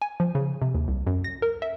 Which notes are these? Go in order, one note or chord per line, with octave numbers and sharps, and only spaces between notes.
G#5
F3
C#3
C3
D#2
C2
F#2
A#6
A#4
E5